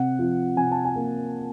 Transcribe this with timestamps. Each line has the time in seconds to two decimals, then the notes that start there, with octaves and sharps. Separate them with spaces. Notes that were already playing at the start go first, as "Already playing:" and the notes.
Already playing: C3 F#5
0.19 F3
0.57 C3 G#5
0.72 A5
0.85 G#5
0.96 A#3